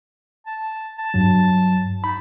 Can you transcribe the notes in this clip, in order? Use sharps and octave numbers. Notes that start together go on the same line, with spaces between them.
A5
A5
G2 F#3
D#4 B5